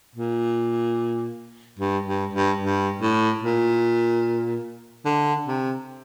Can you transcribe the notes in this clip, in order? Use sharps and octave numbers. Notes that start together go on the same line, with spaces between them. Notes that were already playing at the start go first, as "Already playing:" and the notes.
A#2
G2
G2
G2
G2
A2
A#2
D3
C3